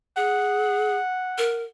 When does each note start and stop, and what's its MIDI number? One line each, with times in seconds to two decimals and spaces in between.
0.16 0.96 68
0.16 1.67 78
1.38 1.63 70